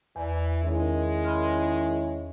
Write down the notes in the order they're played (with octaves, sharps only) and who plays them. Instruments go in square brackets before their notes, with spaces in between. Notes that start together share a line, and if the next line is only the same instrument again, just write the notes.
[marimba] E2 D5 [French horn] E3
[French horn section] D#3 C#4 E4 [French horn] G#3
[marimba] B5 C6 F6